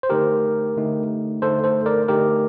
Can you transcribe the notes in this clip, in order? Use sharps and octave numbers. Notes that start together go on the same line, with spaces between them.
C5
D3 A3 D#4 G4 A#4
D3 A3 D#4
D3 A3 D#4 A4 C5
A4 C5
A#4 D5
D3 A3 D#4 G4 A#4